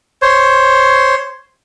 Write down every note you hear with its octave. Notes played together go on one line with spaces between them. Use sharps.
C5 C#5